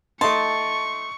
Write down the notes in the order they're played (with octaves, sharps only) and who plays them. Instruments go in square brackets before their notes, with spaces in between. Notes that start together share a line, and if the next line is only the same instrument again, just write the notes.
[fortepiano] A3 D#4 [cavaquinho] A5 [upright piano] C6 [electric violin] C#6